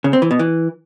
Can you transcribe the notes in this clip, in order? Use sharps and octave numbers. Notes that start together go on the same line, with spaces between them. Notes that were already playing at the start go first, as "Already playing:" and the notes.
C#3
C4
E3
B2
E3